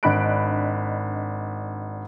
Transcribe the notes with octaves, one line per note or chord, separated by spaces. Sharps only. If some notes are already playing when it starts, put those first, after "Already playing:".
G#1 D4 D#5 B5 F#6 D7